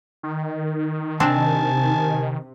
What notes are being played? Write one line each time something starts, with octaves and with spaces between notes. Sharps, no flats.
D#3
C3 C4 D4 G#5 A5